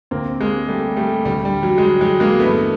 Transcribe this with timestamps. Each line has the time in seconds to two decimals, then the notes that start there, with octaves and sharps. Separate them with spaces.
0.11 D2 D3 A#3 C4
0.41 G#3 A#3
0.68 G3 A3
0.96 G3 A3
1.25 D2 D3 G3
1.45 G3
1.63 F#3
1.78 G#3
1.83 G3
2.01 F#3 G#3
2.20 G#3 A#3
2.39 G2 A3 B3
2.44 E3